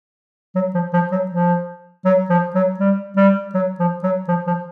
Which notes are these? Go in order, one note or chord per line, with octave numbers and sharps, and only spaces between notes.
F#3
F3
F3
F#3
F3
F#3
F3
F#3
G3
G3
F#3
F3
F#3
F3
F3